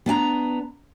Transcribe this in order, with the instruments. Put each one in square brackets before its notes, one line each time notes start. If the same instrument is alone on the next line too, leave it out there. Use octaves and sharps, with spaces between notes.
[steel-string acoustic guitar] B3 D4 G#5 A#5